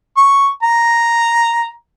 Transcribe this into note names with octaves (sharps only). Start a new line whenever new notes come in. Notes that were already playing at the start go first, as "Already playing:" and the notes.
C#6
A#5